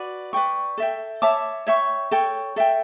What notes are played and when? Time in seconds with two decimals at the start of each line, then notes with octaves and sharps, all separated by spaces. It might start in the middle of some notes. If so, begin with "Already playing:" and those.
Already playing: F#4 B4 D5
0.33 B4 D5 G5 C#6
0.78 A4 E5 G5
1.22 C#5 E5 A5 D6
1.67 C#5 E5 G5 C#6
2.11 A4 C#5 G5
2.56 A4 E5 G5